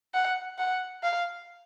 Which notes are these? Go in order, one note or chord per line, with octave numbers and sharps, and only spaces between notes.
F#5
F#5
F5